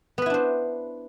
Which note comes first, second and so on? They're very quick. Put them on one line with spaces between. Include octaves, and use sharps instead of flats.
B3 B4 E4 D4 C5